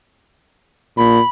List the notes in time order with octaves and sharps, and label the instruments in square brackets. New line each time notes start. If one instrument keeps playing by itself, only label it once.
[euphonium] A#2 [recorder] B5